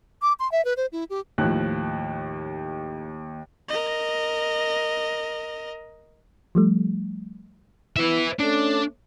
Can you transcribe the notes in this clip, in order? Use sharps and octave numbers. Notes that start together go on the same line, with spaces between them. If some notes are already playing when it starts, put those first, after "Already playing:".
D6
C6
E5
B4
C5
E4
G4
D#2 A2 F3 F#6
A#4 D#5
F3 G3 A3
B3 E4 B4 E5
A3 C#4 D4